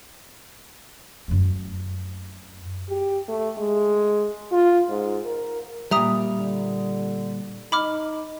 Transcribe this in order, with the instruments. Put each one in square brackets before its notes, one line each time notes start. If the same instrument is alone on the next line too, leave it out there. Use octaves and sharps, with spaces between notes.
[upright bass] F#2 A3
[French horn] G4
A3
G#3
F4
G#2
A#4
[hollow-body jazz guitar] A#2 G3 [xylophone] E5 A#5 D#6
[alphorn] D3
[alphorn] D#4 [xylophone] B5 D6 F6